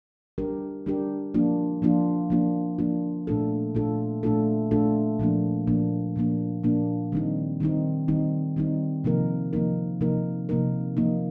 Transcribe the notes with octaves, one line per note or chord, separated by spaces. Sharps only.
G3 D4 G4 A#4
G3 D4 G4 A#4
F3 A#3 D4 F4
F3 A#3 D4 F4
F3 A#3 D4 F4
F3 A#3 D4 F4
A#2 A3 D4 F4 A4
A#2 A3 D4 F4 A4
A#2 A3 D4 F4 A4
A#2 A3 D4 F4 A4
A#2 F3 A#3 D4
A#2 F3 A#3 D4
A#2 F3 A#3 D4
A#2 F3 A#3 D4
D#3 G3 C4 D#4
D#3 G3 C4 D#4
D#3 G3 C4 D#4
D#3 G3 C4 D#4
C3 F3 A#3 D#4 A#4
C3 F3 A#3 D#4 A#4
C3 F3 A#3 D#4 A#4
C3 F3 A#3 D#4 A#4
F3 A#3 D#4